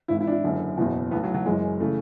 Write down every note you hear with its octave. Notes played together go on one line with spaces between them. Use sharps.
G#1 G#2 E3 E4
E4
D4
E4
F#1 F#2 D3
F#1 E2 B2
B1 A2 E3 B3
F#3
F#3
F#1 F#2 E3 G#3
C#3 E3 A3